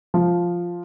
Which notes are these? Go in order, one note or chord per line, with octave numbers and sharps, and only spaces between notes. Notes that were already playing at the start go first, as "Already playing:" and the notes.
F3